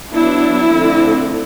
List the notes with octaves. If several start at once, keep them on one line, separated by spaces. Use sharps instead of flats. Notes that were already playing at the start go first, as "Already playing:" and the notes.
F#3 B3 D4 E4
D3 F3 A3 C4